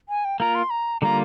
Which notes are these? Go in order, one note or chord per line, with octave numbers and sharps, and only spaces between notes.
G#5
G5
A#3 F4 A#4 A#5
C6
A#5
D3 G3 A#3 F4 A#5